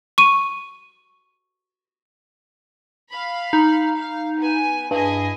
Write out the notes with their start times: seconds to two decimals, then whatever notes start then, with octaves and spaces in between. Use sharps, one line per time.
0.18 C#6 D#7
3.11 F5 B5
3.53 D#4
3.96 F5
4.38 B3 G#5
4.91 G2 E4 G#4 D#5